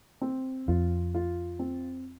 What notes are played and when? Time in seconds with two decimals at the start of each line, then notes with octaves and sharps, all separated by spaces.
0.21 C4
0.68 F2 F4
1.14 F4
1.59 C4